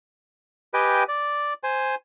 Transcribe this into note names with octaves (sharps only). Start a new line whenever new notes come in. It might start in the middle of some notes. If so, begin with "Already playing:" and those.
G4 B4 D#5 G5 G#5
D5
C5 G#5